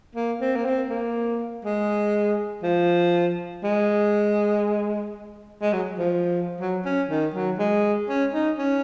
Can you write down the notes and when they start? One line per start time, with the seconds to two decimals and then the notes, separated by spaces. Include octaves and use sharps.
0.15 A#3
0.41 C4
0.56 A#3
0.65 C4
0.90 A#3
1.65 G#3
2.63 F3
3.63 G#3
5.61 G#3
5.73 F#3
5.99 F3
6.61 F#3
6.85 C#4
7.09 D#3
7.34 F#3
7.59 G#3
8.09 C#4
8.34 D#4
8.58 C#4